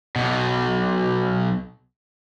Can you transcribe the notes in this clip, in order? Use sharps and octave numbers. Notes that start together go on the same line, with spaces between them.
B1 B2